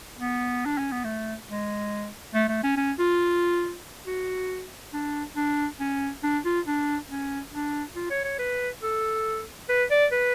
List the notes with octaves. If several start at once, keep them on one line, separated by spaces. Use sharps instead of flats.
B3
D4
C#4
B3
A3
G#3
A3
A3
C#4
C#4
F4
F#4
D4
D4
C#4
D4
F4
D4
C#4
D4
F4
C#5
C#5
B4
A4
B4
D5
B4